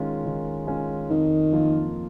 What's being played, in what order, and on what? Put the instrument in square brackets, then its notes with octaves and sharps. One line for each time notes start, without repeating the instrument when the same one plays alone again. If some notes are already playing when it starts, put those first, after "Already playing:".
Already playing: [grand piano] D#3 G#3 C#4 F4
D#3
G#3 C#4 F4
[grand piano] F2 [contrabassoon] D#3
[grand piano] F3 A#3 F4